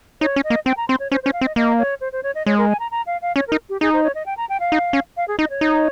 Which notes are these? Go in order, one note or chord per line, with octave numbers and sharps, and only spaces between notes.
D#4 C#5
C#4
D#5
A#3
C4 G5
A#5
C4 C6
C#5
C#4 C5
C5
C#4
F5
C4
D#5
A#3 D#5
C#5
C5
C5
C#5
D#5
G#3 C#5
A#4
G#5
A#5
A#5
F5
F5
C#4 C#5
A#4
D#4
G4
D#4 G#4
C5
C#5
D#5
G5
A#5
G5
F5
D#4
C#4
F5
G#4
D#4 D#5
C#5
D#4